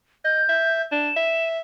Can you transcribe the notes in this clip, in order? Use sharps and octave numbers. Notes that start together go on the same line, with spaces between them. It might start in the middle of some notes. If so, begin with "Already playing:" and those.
D#5 G6
E5
D4 E7
E5